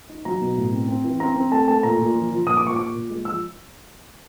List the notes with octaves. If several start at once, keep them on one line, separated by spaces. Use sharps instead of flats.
D#4
F#3 A#5
B2
A2
C4
C4
E3
C4 A#5
C4
A3 A5
A3 A5
A#2 A#5
A#2
F3
F3
A#2 D#6
D6
A#2 C#6
A#2 D6
A#2
G#3
F3 E6